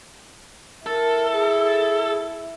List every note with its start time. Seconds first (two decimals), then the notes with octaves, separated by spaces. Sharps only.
0.86 E4 A4 A#4
1.33 G#4